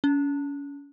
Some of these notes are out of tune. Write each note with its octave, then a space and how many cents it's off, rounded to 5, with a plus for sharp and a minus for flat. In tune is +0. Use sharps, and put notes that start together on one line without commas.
C#4 +35